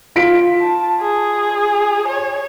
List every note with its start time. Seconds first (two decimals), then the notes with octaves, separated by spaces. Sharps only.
0.16 F4 B6 D7
0.61 A5
1.01 G#4
2.08 C#5